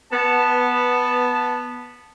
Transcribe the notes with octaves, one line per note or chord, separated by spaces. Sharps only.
B3 A5